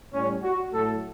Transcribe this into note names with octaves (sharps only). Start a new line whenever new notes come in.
A2 G3 C#4
F#4
A2 F#3 A3 A4